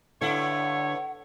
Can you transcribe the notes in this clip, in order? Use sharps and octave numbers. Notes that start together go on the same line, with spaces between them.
G2 D3 E4 C#5 F#5